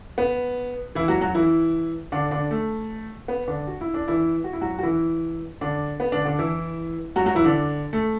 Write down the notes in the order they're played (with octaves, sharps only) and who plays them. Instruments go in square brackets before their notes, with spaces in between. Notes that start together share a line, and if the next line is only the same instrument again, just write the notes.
[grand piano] B3
E3 E4
F#3 F#4
F#3 F#4
E3 E4
D3 D4
D3 D4
A3
B3
D3 D4
F#4
E4
D4
E3 E4
F#4
E4
F#3 F#4
F#4
E3 E4
D3 D4
B3
D3 D4
D3 D4
E3 E4
F#3 F#4
F#3 F#4
E3 E4
D3 D4
A3